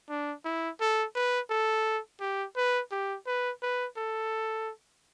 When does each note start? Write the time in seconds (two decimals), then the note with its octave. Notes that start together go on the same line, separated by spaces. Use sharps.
0.09 D4
0.45 E4
0.80 A4
1.16 B4
1.50 A4
2.20 G4
2.56 B4
2.92 G4
3.27 B4
3.62 B4
3.97 A4